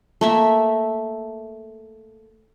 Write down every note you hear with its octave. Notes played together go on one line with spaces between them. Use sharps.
A3 A#3 E5